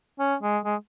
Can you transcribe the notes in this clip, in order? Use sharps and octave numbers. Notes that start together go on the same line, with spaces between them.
C#4
G#3
G#3